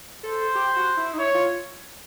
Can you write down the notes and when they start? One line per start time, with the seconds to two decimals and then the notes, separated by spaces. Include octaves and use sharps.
0.23 A4 C5
0.55 G4
0.76 F#4
0.97 E4
1.13 D#4
1.18 E4 C#5
1.34 F4